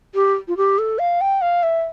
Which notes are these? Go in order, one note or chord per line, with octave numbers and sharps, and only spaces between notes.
G4
F4
G4
A4
F5
G5
F5
E5